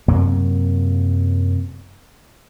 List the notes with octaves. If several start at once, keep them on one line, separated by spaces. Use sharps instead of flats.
F#2 C3 F#3 A#3